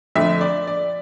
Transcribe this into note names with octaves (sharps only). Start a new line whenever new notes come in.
F2 D3 A3 E5
D5
D5